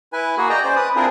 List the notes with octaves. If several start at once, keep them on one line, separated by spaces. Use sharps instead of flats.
E4 B4 G#5
A#3 F#4 G#4
D5 D#5 G5 A#5
C#4 C5 D5
B4 D#6
C4 D4 E4 F4 G#4 A#4